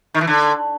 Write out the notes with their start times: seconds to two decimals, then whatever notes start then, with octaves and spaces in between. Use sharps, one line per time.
0.14 D#3
0.21 E3
0.27 D3